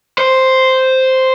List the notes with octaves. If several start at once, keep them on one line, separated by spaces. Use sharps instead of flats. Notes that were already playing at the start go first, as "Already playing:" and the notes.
C5